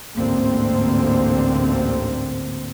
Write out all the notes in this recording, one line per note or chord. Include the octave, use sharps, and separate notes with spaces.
A1 D2 G#2 D3 A#3 C4